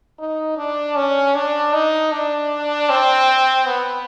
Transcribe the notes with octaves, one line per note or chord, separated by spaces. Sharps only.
D#4
D4
C#4
D4
D#4
D4
C4
B3